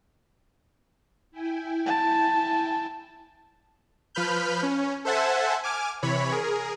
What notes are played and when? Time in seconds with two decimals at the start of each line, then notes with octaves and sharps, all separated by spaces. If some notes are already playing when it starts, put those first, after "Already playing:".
1.31 E4 G5 G#5
1.86 A5
4.15 F3 B4 B5 F6 G6
4.63 C#4
5.05 A4 C5 E5 F#5 G#5 A5
5.63 G#5 D6 F6
6.03 C3 E3 C#5 B5
6.32 G#4 A#4